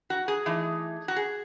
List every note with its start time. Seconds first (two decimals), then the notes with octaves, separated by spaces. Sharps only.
0.10 F#4
0.28 G#4
0.46 E3 A3 D#4
1.08 F#4
1.16 G#4